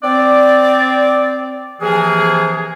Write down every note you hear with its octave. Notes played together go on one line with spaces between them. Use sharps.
C4 D5
C3 E3 F3 A#3 G#4